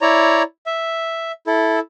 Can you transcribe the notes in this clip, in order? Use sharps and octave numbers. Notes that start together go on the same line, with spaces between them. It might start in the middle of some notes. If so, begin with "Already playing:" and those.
E4 C#5 D5 A#5
E5
E4 A4